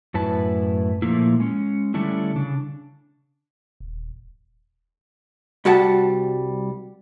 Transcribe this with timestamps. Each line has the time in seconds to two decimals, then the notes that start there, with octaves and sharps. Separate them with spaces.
0.14 F#2 A2 E4 B4 A5
1.02 A#2 F3 A3 A#3 E4
1.40 G#3 C#4
1.94 D3 G3 A3 C#4 D4 E4
2.36 C#3 D4
3.80 D#1
5.65 C2 G3 F#4 F#5 A5